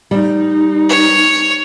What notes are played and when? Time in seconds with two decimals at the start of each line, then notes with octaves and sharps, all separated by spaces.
0.11 G3 D#4
0.89 C#5